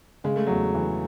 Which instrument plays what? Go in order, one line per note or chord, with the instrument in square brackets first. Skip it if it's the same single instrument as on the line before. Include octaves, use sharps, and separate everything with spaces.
[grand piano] C#3 [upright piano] G#3
[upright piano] A3
[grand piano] E2 [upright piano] F#3 G#3
[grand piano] E3